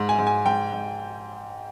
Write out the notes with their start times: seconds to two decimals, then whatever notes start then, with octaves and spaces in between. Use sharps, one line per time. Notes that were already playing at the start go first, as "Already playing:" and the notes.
Already playing: G#2
0.09 G#5
0.18 G#2
0.27 G#5
0.46 G#2 G5
0.72 G#2